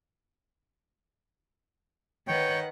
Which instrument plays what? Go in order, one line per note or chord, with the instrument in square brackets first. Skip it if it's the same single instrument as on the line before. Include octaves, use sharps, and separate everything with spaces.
[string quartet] D#3 B4 F#5 [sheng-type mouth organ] C#5 G5